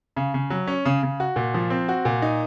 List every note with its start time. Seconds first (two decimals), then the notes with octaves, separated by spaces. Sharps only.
0.16 C#3
0.34 C#3
0.50 F#3
0.67 C#4
0.85 C#3
1.03 C#3
1.20 F#4
1.36 A#2
1.54 F3
1.70 C4
1.89 F#4
2.05 A#2
2.22 D#4